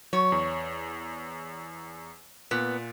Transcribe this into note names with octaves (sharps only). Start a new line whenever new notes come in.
F#3 C#5
E2
A#2 B3